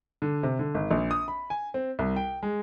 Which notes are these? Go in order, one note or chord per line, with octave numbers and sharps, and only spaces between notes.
D3
C3
D3
G#1
A#1
D#6
B5
G#5
C4
C2
G5
G#3